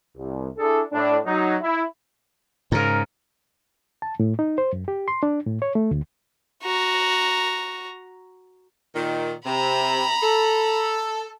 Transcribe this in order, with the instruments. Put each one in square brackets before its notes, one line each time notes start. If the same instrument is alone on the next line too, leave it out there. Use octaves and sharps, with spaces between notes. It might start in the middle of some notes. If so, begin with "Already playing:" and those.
[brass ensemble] C2
D4 E4 G#4 A4
A2 D4
F#3 D#4
E4
[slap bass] G#2 C#3 [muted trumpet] A#4
[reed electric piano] A5
A2
D#4
C5
F#2
G4
C6
D4
A2
C#5
A3
D2
[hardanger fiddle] F#4 A#5
[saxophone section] A#2 D#3
[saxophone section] C3 [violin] A#5 B5
[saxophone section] A4